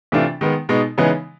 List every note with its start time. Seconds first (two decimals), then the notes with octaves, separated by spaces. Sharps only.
0.12 C3 E3 A3 D4 F4
0.41 D#3 G#3 B3
0.69 B2 G#3 B3 D#4
0.98 C#3 E3 G#3 B3 D#4